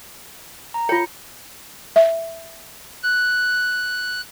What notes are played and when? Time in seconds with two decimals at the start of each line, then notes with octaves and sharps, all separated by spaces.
0.74 A#5
0.89 F4 C#5 C#7
1.96 E5
3.03 F#6